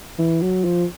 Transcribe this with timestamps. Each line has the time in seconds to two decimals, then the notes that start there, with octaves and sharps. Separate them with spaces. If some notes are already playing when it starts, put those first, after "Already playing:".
0.19 E3
0.42 F#3
0.64 F3